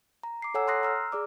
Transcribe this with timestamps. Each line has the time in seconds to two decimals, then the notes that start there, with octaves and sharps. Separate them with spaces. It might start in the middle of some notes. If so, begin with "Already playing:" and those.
0.23 A#5
0.42 D6 C7
0.54 A4 C#5 F#5 G#5 A#5 E6
0.67 A#5 C6 D#6 F#6 A#6 C7
0.83 A#5 E6 F6
1.12 G#4 D5 D6